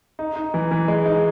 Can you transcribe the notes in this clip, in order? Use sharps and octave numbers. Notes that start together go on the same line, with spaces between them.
D#4
D#4
E3
E3
G#3
D#4